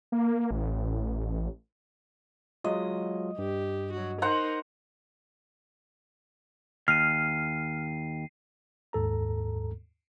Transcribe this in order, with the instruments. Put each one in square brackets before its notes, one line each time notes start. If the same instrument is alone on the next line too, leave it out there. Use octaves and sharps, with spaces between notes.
[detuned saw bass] A#3
A1
[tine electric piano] F#3 G#3 F4 [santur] D#5
[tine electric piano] G2 [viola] G4
[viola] F#3 F#4
[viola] D#4 A#4 [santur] C5 F#5 A#5
[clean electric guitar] D#2 [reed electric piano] F6 [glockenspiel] C7 D#7
[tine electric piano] D#2 G#2 A4 A#5